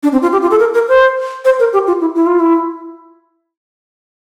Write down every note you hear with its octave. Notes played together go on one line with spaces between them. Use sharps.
D4
C4
F4
G4
F4
A4
A#4
A#4
C5
C5
A#4
G4
F4
E4
E4
F4
E4